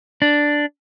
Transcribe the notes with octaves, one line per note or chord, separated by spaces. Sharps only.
D4